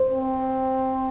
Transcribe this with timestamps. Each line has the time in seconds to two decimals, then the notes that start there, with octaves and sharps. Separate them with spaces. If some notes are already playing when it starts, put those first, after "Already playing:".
Already playing: C5
0.12 C4